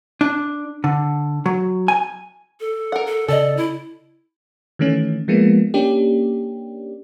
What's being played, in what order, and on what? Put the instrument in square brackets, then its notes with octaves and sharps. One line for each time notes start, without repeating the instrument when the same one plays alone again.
[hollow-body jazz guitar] D4
D3
F#3
G#5
[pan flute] A4
[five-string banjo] A#4 F#5
[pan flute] A4
[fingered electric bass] C#3 [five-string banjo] A4 D#5 [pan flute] D5
[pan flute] E4
[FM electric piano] D#3 E3 A3 C#4
F3 G#3 A#3 B3
A#3 C#4 D4 G4